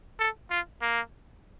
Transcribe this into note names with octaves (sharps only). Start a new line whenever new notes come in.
A4
F4
A#3